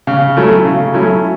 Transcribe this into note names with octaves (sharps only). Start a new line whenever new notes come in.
C#3
F#3 A3 C#4 E4
C#3
F#3 A3 C#4 E4